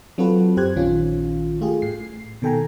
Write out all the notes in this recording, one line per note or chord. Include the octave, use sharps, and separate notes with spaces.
F#3 C4 F4 F#4 A4 B4
F#2 G4 C5 F#6 G#6
A#1 D#3 C#4 F4
A3 F4 G4 G#4
A2 C7
B2 D#3 A4 G5 G#5 A#5